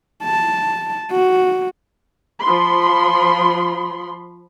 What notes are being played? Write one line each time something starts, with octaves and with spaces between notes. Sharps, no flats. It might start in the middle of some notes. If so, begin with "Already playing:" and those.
A5
F#4
F3 B5 C6